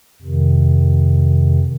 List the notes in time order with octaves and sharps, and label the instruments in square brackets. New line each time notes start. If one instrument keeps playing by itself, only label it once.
[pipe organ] F2 C3 D#3